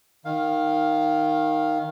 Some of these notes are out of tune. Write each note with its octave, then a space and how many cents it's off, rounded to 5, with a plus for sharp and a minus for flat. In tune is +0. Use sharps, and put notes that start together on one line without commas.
D#3 +0 F5 +5